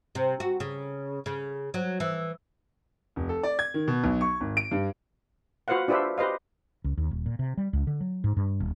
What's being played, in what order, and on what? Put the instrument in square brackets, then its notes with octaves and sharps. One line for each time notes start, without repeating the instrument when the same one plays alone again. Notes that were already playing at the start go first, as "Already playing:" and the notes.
[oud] C3
F#4
C#3
C#3
F#3
E3
[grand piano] F1
A4
D5
G#6
D#3
B2
B1
C#6
G#1
D7
G2
[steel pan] F4 F#4 B4 C5 F5 F#5
D4 F4 G4 B4 C5 E5
G4 B4 C5 D#5 F5
[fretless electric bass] C#2
D#2
D#1
A#2
C3
G3
C#2
D3
F#3
G#2
G2
D#1